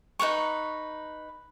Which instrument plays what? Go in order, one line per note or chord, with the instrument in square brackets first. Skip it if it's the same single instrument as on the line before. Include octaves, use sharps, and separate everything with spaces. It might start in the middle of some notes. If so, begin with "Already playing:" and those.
[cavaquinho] D#4 B4 A#5 C#6